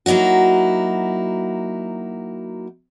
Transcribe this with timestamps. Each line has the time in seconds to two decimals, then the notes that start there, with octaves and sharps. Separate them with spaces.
0.06 F#3 A#3 D#4 E4 F#4